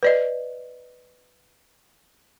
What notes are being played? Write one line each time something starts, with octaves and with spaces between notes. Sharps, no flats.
B4 D5 D#5